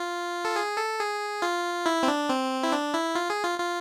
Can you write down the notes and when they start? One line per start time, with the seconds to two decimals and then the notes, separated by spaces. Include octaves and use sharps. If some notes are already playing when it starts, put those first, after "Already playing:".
Already playing: F4
0.45 A4
0.56 G#4
0.78 A4
0.99 G#4
1.42 F4
1.86 E4
2.03 C4
2.08 D4
2.29 C4
2.63 E4
2.72 D4
2.94 E4
3.15 F4
3.30 G#4
3.44 F4
3.59 F4